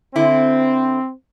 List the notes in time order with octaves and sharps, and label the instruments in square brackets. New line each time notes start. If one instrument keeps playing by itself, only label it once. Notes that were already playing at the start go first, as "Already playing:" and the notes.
[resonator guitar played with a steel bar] D3 E4 [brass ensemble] C4